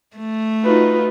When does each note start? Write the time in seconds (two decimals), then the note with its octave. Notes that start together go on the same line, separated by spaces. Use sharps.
0.17 A3
0.64 D#4 F4 F#4 B4